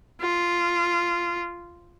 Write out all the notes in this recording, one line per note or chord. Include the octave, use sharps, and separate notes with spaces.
F4